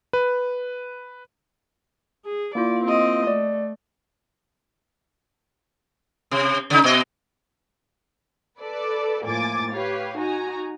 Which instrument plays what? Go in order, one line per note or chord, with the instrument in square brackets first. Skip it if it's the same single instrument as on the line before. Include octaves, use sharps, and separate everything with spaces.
[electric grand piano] B4
[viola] G#4
[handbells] A#3 E4 F4 [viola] D5
[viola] C4 D#5
[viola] A3 [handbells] D5
[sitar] C3
C#3 D#4
B2 D#5
[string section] A4 B4 D5
A2 F3 A#3 G#5 D6 A6
G4 B4 C#5 F5
D#4 F#4 G#5 A#5